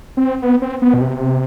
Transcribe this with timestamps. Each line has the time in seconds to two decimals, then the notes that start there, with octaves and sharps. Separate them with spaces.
0.17 C4
0.42 B3
0.62 C4
0.82 B3
0.94 B2
1.01 C3